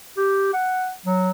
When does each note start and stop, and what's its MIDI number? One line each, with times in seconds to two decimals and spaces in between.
0.17 0.51 67
0.54 0.92 78
1.06 1.31 54